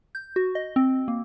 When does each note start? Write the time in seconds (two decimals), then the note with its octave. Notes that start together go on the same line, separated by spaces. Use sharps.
0.15 G6
0.36 F#4
0.55 D#5
0.76 C4
1.08 A#3